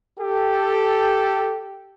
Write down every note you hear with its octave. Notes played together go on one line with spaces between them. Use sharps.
G4 A4